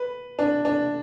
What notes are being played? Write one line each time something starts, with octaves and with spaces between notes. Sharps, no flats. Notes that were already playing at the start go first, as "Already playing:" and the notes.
Already playing: B4
D4
D4